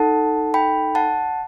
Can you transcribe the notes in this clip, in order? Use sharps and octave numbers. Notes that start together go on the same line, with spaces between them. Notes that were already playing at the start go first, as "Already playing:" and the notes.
Already playing: D#4 A4 F#5 A5
G5 B5
F#5 A5